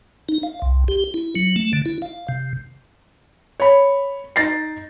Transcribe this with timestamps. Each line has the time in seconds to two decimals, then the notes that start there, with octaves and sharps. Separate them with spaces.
0.29 D#4
0.43 F5
0.62 C2
0.88 G4
1.14 E4
1.36 F#3
1.56 A3
1.73 D3
1.86 E4
2.02 F5
2.29 C3
3.60 C#5 B5
4.36 D#4 A6 A#6 C7